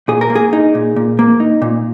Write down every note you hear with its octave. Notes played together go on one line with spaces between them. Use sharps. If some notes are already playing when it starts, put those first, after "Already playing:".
A#2 G#4
A#4
A#3
G#4
D#4
A#2
A#2
A#3
D#4
A#2